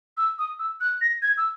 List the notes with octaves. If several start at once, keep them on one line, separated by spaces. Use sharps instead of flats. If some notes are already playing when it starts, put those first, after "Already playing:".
E6
D#6
E6
F#6
A#6
G#6
E6